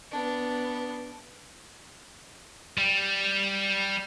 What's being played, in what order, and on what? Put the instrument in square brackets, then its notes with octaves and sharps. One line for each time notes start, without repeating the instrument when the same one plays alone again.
[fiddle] B3 D4
[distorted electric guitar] G3